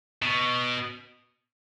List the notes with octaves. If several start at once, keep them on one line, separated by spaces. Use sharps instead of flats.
B2